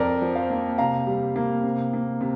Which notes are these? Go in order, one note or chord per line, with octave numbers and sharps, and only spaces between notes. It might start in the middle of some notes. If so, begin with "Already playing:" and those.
Already playing: F2 A#4 D5
F3
C5 F5
A#3
C3 F5 A#5
G3
A#3
C3
A#3
C3